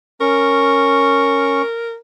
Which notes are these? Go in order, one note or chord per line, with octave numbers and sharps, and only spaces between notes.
C#4 A#4 C#6